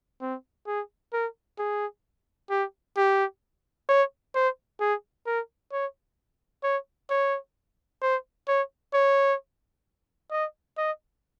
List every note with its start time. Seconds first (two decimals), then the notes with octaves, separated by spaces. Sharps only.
0.21 C4
0.67 G#4
1.13 A#4
1.59 G#4
2.50 G4
2.97 G4
3.89 C#5
4.35 C5
4.80 G#4
5.26 A#4
5.72 C#5
6.64 C#5
7.10 C#5
8.02 C5
8.48 C#5
8.93 C#5
10.31 D#5
10.78 D#5